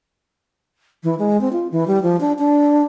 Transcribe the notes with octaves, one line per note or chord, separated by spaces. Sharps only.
E3
G#3
C4
F4
E3
G3
F3
D4
D4